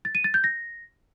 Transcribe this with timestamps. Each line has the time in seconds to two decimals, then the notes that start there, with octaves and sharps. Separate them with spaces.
0.05 A6
0.15 D#7
0.24 A6
0.34 G6
0.44 A#6